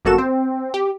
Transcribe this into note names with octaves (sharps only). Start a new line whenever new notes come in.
G1 F#2 A#3 F#4 A4 E7
C4
G4